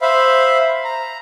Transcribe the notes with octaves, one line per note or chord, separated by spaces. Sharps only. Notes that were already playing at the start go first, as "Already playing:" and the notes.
C5 E5 F5 B5
A#5